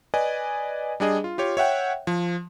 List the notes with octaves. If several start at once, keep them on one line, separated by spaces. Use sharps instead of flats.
B4 D5 D#5 G#5
G3 D4 G#4 D#5
F4
F4 G4 C#5
C#5 E5 F#5 G5
F3